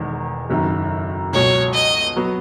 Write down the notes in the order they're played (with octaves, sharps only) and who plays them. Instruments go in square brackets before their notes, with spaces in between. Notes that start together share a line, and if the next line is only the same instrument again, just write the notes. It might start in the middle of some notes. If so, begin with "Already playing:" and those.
Already playing: [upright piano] E1 E2 D#3 G#3
F#1 F#2 D#3
[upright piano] C#2 B2 F#3 [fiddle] C#5
[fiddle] D#5
[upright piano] F#3 B3 F#4